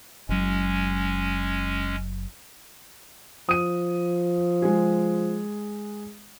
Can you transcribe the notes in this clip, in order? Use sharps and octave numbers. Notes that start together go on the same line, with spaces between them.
F#1 F#3 G#3 C#4
F3 D#6 D#7
G#3 G#4